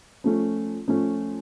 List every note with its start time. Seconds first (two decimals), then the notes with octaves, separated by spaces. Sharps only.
0.24 F3 A3 C#4
0.88 F3 A3 C#4